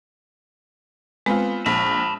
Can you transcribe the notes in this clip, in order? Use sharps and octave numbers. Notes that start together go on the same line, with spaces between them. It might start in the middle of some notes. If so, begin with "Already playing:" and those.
G#3 B3 C4 F4
A#1 A5 B5